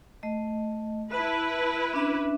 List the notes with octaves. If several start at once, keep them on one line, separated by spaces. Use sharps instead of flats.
A3 D#5
E4 B4 E5 A5
C#4 D4 E5